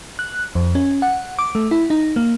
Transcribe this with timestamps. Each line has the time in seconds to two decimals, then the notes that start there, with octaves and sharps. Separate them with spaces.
0.19 F#6
0.55 F2
0.75 C#4
1.02 F#5
1.39 D6
1.55 A3
1.71 E4
1.90 D#4
2.16 A#3